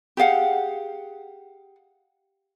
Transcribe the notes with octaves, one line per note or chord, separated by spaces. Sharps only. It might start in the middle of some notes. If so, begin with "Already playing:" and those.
G4 G#4 F5 F#5